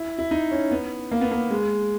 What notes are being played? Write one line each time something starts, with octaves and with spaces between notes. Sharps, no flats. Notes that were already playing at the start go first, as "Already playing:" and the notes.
Already playing: E4
E4
D#4
C#4
B3
A#3
B3
A#3
G#3